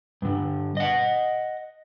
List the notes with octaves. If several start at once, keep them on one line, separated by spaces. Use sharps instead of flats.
G2 D3
D#5 F#5